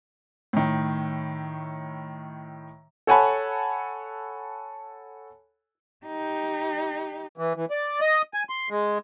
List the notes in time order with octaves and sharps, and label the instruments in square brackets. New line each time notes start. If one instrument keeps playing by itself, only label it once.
[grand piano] A2 D#3
A4 C#5 F#5 G#5 A5 B5
[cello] D#4 G4
[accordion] E3
E3
D5
D#5
G#5
C6
G#3